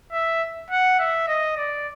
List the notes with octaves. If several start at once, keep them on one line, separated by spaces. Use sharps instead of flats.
E5
F#5
E5
D#5
D5